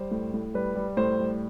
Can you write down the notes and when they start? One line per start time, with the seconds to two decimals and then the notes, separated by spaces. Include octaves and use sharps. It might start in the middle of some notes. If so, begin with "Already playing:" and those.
Already playing: G3 C5
0.11 A2
0.34 A2
0.54 G3 B4
0.75 G3
0.97 A2 C5
1.19 G3